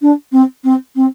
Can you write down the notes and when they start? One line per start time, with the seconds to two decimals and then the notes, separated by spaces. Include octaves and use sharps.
0.01 D4
0.32 C4
0.64 C4
0.95 C4